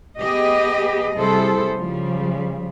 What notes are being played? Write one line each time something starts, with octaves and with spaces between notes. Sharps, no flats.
B3 G4 G#4 D#5
C3 G3 E4 G#4 A4 C5
C#3 F3 G3